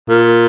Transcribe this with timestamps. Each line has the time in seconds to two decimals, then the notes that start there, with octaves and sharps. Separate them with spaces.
0.09 A#2